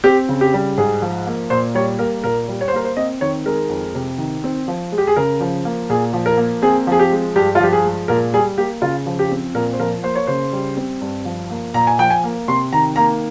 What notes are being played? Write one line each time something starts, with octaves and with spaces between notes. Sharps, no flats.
C4 G4
C#3
G4
G3
G#2 G#4
F3
A#3
A#2 C5
G3 C#5
A#3 A#4
A#2 A#4
G3
C#5
C5
A#3 A#4
C5
C4 D#5
D#3 C#5
G#3 A#4
F2
C3
D#3
C4
F3
G#3
G4
G#4
C#3 A#4
F3
A#3
A#2 G#4
F3
A#4
A#3
C4 G#4
F3 G#4
G4
G#3
G2 G4
F4
F3 G4
G#4
G#3
A#2 A#4
G3 G#4
A#3 G4
C#3 F4
F3
G4
C4
A#2 A#4
C5
F3 A#4
A#3 C5
C#5
C#3 C5
G3
C4
G2
F3
A#3
A#2 A#5
G#5
F3 G5
G#5
A#3
C3 C6
D#3 A#5
A#3 A#5